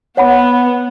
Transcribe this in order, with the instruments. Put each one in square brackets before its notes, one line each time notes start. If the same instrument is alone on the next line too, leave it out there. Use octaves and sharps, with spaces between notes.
[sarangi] B3 [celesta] C#5 F#5 B5